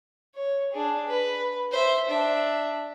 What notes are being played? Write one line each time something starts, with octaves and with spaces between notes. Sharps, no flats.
C#5
D4 G#4
B4
C5 E5
D4 E5